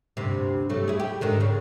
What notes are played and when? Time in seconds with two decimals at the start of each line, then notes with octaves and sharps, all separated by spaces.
0.17 D2 G2 C3
0.69 G2 F#3 A3
0.88 E4 G#4
1.00 G4
1.21 G#2 D3 D#3
1.40 C#3